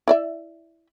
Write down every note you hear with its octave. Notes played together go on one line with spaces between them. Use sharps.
E4 D5 E5